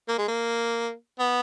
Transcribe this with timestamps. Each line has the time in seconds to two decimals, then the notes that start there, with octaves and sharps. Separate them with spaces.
0.08 A#3
0.18 G#3
0.28 A#3
1.19 B3